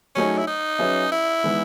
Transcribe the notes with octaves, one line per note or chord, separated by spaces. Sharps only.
F#3 A3 C#4 D#4 G#4 C#5
E4
D#4
F#3 C#4 G#4 B4 E5
E4
E3 G#3 B3 D#4